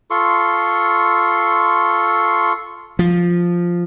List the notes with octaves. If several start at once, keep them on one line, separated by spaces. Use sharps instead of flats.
F4 A4 C6 C#6
F3